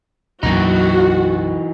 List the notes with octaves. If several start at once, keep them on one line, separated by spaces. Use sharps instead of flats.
B1 F#2 E3 A#3 D#4 F#4